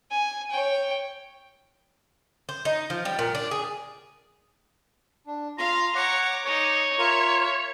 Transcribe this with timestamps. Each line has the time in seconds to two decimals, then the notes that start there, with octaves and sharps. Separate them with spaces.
0.11 G#5
0.51 C#5 G5
2.49 C5
2.65 D#4
2.90 F3
3.05 G3
3.19 A#2
3.35 D4
3.51 G#4
5.27 D4
5.58 F4 F5 A#5 C6
5.95 C#5 F#5 A#5 D6
6.46 D#4 C#5
6.99 F4 A#4 E5